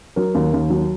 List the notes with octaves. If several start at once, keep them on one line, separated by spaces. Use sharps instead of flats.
F#3 A#4
D#2
D#2
F#3